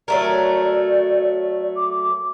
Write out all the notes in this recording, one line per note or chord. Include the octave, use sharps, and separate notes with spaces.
F#3 A3 A#4 D5
D6